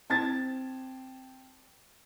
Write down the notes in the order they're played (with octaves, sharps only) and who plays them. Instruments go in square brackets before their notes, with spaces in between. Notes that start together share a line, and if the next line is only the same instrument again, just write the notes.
[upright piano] C4 A5 G#6 A6